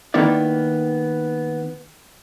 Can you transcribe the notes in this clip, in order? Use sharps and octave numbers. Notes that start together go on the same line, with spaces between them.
D#3 A#3 B3 E4 D5